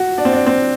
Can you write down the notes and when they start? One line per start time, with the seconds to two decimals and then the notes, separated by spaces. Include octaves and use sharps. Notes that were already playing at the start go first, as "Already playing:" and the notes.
Already playing: F#4
0.18 D4
0.25 C4
0.33 D4
0.46 C4